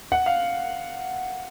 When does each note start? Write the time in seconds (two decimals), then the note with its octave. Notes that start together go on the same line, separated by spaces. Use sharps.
0.12 F#5
0.26 F5